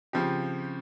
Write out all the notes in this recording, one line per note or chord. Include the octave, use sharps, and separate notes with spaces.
C#3 F3 C4 G4